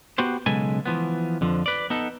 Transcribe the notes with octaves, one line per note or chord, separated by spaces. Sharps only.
B3 F#4 G4 C5
B1 C#3 G#3 A4 B4 G#5
E3 F3 B3
F2 D3 F3
B4 D5
B3 D#4 A4